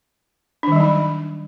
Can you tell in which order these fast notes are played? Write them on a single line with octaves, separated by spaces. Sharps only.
D4 D#3 G3 F#3 D#4